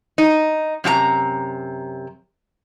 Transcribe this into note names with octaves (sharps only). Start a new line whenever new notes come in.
D#4
F#2 C3 F#4 A#5